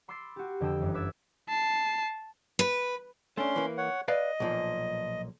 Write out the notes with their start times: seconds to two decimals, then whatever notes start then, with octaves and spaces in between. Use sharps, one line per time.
0.08 B5 C6 D6 E6 A6 C7
0.36 F#4 G4
0.60 F2 D3 G5 D#6 E6
0.80 G1 F#2 E3
0.94 B4 D6 E6 G#6 A6
1.48 A5 C7
2.59 B4
3.37 A3 C#4 D4 C6
3.56 E3 A#3
3.78 C#5 F#5
4.08 B4 D5 D#5 F5
4.40 B1 A#2 F3